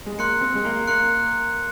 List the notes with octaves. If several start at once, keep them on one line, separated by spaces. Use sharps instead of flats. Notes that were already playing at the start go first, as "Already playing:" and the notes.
G#3
A#3 C6 F#6 C#7
C4
G#3
A#3
A#3 C6 F#6 C#7